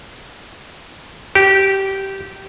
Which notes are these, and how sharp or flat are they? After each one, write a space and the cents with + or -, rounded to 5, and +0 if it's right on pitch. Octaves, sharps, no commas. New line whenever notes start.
G4 -15